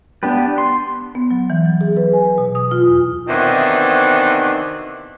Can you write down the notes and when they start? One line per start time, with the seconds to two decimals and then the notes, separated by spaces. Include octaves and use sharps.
0.23 B3 D4 G4 B4
0.58 C6
1.15 B3
1.31 F#3
1.50 E3
1.65 F#3
1.81 G#4
1.97 B4
2.13 G#5
2.25 B4
2.38 B2
2.55 D#6
2.71 F4
2.87 E2
3.29 C3 D#3 E3 B3 D4 F#4